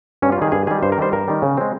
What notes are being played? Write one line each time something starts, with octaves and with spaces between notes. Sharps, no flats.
G2 C#4
F4
D#3 G3 G#4
G2 G#4
D#3 G3 G#4
G2 C5
A#4
D#3 G3 C5
G2 A#4
D#3 G3
C#3
G#3 C4